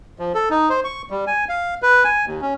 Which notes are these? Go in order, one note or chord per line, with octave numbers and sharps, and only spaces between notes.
F3
A4
D#4
C5
C#6
G3
G#5
F5
B4
G#5
D#2
C#4